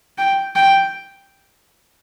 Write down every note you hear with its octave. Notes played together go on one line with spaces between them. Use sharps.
G5
G5